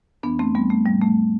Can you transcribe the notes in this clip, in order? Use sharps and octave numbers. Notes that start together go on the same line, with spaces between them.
F2 E3 B3 D4
A3 C4
G3 B3
A3
A2 F3 G3
A3